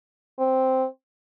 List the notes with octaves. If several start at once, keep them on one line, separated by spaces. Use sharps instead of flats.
C4